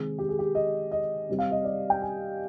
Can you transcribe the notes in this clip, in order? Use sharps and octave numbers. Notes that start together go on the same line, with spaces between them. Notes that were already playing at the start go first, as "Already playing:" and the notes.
Already playing: C3 D#3 G#3 C4 G#4
G4
G#4
G4
D#5
D#5
C3 G3 C4
F5
D#5
D5
G5
G#5